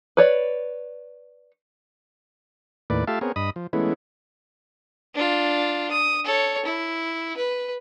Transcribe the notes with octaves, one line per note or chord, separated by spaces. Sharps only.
B4 C#5 D5
D#2 A2 B4 D5
A3 F4 G4 E5 F5 A5
B3 C4 G#4 A#4 C#5
G2 D#5 B5 D#6
F3
E3 G#3 A3 B3 C#4 E4
D4 F4
D#6
A4 C#5
E4
B4